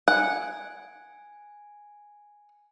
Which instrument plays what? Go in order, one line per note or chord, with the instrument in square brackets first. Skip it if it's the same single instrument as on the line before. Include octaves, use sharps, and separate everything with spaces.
[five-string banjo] F#5 [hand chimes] G#5